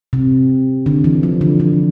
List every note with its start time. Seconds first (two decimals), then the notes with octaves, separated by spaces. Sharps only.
0.13 C3
0.86 D3
1.04 E3
1.23 F3
1.41 D3
1.60 D3